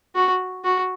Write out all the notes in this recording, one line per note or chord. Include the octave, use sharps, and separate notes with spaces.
F#4
F#4